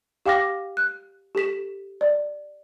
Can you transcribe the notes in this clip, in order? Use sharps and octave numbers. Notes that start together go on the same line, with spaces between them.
G4 F5 G5 D6 F6 A#6
F#6
G4 A4 B6 E7
D5